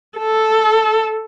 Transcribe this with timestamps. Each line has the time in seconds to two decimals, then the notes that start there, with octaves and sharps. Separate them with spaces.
0.18 A4